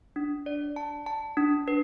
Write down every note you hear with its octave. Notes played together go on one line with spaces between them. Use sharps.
D4
D5
A5
A5
D4
B4